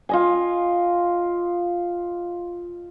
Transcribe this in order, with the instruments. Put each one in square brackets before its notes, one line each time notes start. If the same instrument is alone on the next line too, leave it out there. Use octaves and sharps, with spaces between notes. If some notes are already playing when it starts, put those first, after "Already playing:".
[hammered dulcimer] F4 D#5 G#5